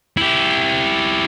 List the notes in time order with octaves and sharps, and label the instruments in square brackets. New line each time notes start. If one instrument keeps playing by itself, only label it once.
[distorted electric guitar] E4 G4